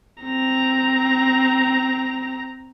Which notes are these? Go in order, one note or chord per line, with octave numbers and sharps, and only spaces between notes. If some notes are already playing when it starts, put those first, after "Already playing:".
C4 A#5